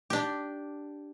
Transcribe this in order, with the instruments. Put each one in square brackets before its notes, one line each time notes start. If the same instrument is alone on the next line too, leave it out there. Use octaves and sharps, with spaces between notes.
[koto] D4 G4